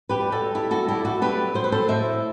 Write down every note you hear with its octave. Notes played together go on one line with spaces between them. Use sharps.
G4 B4
G3
F#4 A4
G3 E4 G4
F#4 A4
G3 E4 G4
F#4 A4
F#3 G4 B4
F#3 C5
B4
A4 C5
A2 C5 E5